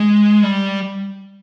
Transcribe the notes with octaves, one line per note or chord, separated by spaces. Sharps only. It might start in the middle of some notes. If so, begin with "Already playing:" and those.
Already playing: G#3
G3